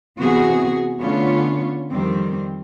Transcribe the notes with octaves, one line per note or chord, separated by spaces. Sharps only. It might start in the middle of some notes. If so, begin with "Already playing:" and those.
C3 E3 B3 C4 F#4 G#4
D3 A3 B3 C#4 F4 C#5
F2 D#3 G3 C4